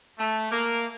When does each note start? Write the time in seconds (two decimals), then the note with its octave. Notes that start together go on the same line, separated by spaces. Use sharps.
0.18 A3
0.51 A#3